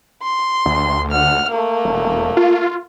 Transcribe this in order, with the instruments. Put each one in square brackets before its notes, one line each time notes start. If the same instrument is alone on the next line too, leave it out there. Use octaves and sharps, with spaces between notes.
[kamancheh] C6
[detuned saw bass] D2
[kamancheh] F#5 F6
A3 A#3
[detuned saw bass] E1
F4